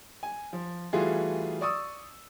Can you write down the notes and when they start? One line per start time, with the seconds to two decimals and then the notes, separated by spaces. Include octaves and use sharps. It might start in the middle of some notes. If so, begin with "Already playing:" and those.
0.23 G#5
0.53 F3
0.93 E3 G3 A3 F4 F#4 G#4
1.61 D5 C#6 D#6 E6